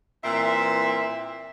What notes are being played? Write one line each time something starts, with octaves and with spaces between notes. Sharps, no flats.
A#2 E3 C4 E5